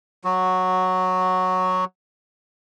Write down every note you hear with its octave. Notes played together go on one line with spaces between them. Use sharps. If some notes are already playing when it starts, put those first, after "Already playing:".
F#3 F#4